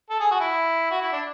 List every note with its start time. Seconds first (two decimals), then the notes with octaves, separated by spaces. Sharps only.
0.10 A4
0.20 G#4
0.31 F#4
0.40 E4
0.91 F#4
1.01 E4
1.12 D4